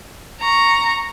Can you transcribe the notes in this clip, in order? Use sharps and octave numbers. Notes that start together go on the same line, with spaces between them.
A#5 C#6